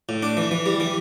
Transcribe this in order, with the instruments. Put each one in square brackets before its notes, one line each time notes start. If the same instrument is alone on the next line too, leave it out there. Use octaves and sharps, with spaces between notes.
[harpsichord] A2
D4
E3
E3
G3
E3